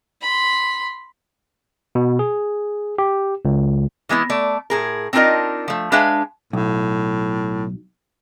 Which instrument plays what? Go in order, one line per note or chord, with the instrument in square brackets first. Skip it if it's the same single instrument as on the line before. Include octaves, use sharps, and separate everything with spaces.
[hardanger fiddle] B5 C6
[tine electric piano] B2
G#4
G4
C#2
[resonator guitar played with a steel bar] E3 G#3 B3 E4
A3 D5
A2 G#4 A#4
C4 D4 D#4 F4 A#4 D#5
F3 A3
G#3 D4 B4 E5 F5 G#5
[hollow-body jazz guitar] B1 [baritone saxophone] A2